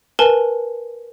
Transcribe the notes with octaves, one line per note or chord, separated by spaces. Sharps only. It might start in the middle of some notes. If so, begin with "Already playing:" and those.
A#4 B4 G#5 A5